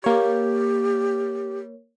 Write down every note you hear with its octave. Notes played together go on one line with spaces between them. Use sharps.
A#3 G4 C#5